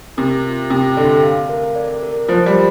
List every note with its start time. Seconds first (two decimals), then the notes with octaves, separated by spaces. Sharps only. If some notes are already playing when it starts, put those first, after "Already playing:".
0.17 C3 A#4
0.45 F4
0.70 C3 G5
0.97 D3 D5
1.23 F5
1.49 A#4
1.76 D5
2.03 A#4
2.28 F3 C5
2.46 G3